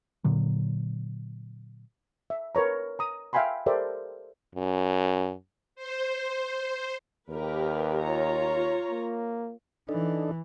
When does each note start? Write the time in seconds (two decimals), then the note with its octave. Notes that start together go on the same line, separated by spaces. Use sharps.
0.24 A#2 D3 F#3
2.30 E5
2.55 A#4 B4 C#5 A#5
2.99 A#5 D#6
3.33 E5 F5 G5 G#5 B5 C6
3.66 G4 A4 A#4 C5 D5 E5
4.55 F#2
5.75 C5
7.29 D#2 G4 A#4 B4
8.01 F4 C#5 A#5
8.91 A#3
9.89 E3 D4 D#4 A4